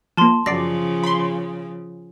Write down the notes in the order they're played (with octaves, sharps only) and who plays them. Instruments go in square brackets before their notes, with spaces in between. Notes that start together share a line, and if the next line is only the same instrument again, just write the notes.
[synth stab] F3 A#3 [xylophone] A5 C6
[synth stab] F#2 D5 [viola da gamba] C#3 F3 [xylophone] A#6 C7
[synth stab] B5 C6